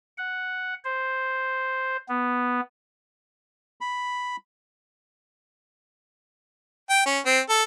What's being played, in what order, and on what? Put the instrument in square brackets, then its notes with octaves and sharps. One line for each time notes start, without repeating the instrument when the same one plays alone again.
[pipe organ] F#5
C5
B3
[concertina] B5
[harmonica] G5
C#4
C4
A4